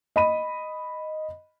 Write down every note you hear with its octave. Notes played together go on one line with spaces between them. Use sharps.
D#5 B5 D#7